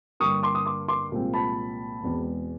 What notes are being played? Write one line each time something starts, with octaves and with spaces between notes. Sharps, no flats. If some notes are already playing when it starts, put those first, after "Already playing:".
G2 D3 G3 A#3 C#6 D#6
C6 D6
D#6
C6 D6
C6 D6
C2 A#2 F3 G#3 C4
A5 B5
E1 E2 B2 G#3 C4